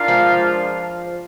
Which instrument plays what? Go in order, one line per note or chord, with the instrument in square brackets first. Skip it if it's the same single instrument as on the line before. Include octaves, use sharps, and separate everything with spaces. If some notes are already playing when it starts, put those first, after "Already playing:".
Already playing: [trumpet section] D4 F4 A#4 F5
[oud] F3 G#3